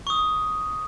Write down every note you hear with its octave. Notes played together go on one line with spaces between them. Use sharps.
C#6 D#6